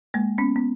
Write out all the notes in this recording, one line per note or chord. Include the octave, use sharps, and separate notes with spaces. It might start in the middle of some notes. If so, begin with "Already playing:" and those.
G#3 A#3
B3 C#4
B3